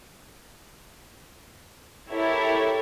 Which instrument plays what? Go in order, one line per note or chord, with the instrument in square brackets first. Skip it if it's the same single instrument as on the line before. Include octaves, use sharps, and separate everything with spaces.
[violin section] E4 G4 A4 A#4 C#5 E5